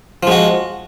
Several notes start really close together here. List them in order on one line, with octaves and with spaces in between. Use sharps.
F3 G#3 F#4